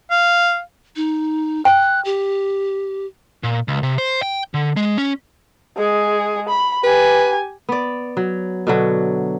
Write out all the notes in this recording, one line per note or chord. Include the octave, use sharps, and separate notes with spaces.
F5
D#4
G5 F#6
G4
A#2
C#2
C3
C5
G5
D3
G#3
C#4
G#3 G#4
B5
G4 B4 G#5
B3 D5
F#3
B2 D3 F#3